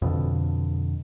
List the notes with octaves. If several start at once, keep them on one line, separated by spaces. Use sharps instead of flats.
F2 B2 D3